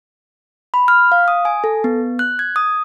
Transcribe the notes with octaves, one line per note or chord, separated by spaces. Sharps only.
B5
F6
F5
D#6
G#5
A4
B3
F#6
G#6
D#6